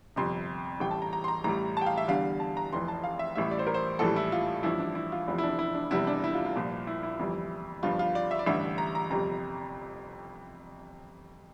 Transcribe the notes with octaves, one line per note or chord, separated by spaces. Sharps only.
G1 F2 C3 C6
A1 A2 G3 G5
A5
A#5
A#5
C6
A#5
A1 A2 G3 A#5
G5 A5
F5
E5
E2 D3 G3 F5
A5
A#5
F1 F2 E3 C6
A5
F5
E5
A1 A2 G3 E5
D5
C5
A#4
C5
A#1 A2 E3 G3 A4
E4
F4
A1 G2 F3 E4
D4
E4
F4
F1 E2 C3 F3 E4
E4
D4
E4
D4
F1 E2 C3 G3 E4
D4
E4
F4
F4
C2 A#2 F3
E4
E4
G1 F2 E3 G3
G1 G2 F3 F4
F4
D5
E5
D5
A1 G2 D3 G3 E5
A#5
A#5
G1 F2 C3 G3 A#5